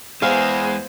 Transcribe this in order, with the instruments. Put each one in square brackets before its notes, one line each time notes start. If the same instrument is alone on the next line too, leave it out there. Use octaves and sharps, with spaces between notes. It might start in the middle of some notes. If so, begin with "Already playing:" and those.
[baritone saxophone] E2 [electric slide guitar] G#3 [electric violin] B3 C5 [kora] F5